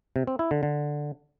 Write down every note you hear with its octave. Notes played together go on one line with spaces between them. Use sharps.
C3
C4
E4
D3
D3